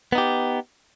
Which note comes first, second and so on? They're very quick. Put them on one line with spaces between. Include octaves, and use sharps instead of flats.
B3 D#4 G4